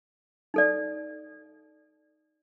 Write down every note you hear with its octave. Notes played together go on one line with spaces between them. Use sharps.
D#4 A4 D5